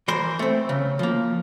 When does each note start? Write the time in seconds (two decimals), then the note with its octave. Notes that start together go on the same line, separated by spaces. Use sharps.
0.08 E3 A#4 C5
0.39 A3 C4
0.69 C#3
0.99 F3 A#3